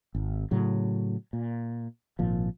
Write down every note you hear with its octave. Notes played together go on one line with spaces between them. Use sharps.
G#1
A2 C#3 F#3
A#2
G#1 A#2 F3